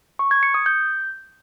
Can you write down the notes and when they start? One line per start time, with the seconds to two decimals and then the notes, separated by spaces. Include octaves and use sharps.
0.19 C#6
0.31 G#6
0.43 C#7
0.54 D#6
0.66 G6